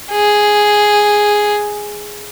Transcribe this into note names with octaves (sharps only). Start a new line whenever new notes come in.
G#4